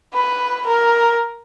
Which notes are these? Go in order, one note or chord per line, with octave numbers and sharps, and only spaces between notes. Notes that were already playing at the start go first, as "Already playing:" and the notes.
B4
A#4